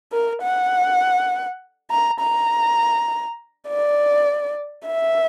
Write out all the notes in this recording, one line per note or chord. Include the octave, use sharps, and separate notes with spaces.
A#4
F#5
A#5
A#5
D5
E5